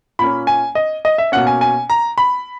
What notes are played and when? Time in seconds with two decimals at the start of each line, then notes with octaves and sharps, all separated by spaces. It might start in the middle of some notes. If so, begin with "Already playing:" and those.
0.19 A#2 A#3 C#4 B5
0.47 G#5
0.75 D#5
1.05 D#5
1.18 E5
1.32 B2 A#3 C#4 F#5
1.47 G#5
1.61 G#5
1.90 A#5
2.18 B5